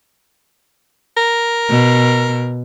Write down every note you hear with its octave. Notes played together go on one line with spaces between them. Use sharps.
A#4
B2